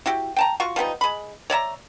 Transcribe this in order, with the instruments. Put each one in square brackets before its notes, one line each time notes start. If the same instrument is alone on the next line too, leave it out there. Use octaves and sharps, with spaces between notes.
[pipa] E4 F#4 G4
G5 A5 A#5
F4 F#4 C#6
F3 G3 B3 D#4
G#3 B5
C#5 D5 E5 A#5